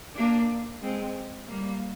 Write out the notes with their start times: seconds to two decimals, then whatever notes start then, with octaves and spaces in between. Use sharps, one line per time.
0.16 A#3 D4
0.82 G#3 C4
1.49 G3 A#3